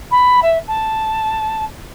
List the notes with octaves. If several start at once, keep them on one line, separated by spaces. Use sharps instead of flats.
B5
E5
A5